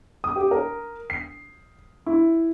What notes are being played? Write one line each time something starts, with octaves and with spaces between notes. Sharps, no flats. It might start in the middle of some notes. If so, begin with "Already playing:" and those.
D#6
G4
A#4
C7
E4